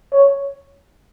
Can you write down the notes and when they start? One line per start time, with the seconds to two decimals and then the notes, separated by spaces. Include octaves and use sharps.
0.13 C#5